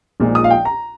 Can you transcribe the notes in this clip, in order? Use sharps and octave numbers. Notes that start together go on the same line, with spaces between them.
A#1 A#2 F3 G#3 D#4
D#6
F5
G5
A#5